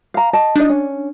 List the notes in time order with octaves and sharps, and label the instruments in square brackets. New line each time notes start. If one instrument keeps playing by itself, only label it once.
[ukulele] F5 A#5
D#5 A5
[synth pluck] D4 [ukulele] D#4 D#5
[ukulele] C#4